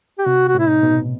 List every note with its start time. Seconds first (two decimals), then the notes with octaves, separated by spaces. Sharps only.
0.19 G4
0.26 C3 F#4
0.48 F#4
0.55 A2
0.59 E4
0.69 D#4
0.83 B2